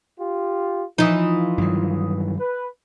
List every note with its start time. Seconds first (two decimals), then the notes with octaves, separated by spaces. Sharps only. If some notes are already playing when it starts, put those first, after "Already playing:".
0.18 F4 G4
0.98 E3 F3 D#4 F4 D#6
1.58 G2 D#3 F#3
2.38 B4